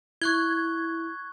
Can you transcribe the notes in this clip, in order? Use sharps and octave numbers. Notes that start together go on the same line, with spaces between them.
E4 C#6 F#6 G#6 G7